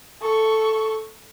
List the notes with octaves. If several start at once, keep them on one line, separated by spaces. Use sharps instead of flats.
A4 C#6